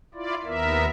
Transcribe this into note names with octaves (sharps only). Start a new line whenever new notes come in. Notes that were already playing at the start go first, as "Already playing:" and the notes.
E4 F4 D5
D#2 B3 A#4 E5